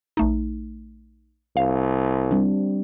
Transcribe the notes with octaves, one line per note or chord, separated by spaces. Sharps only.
A#1 A3 D#4
C2 F5
G3 C4 D4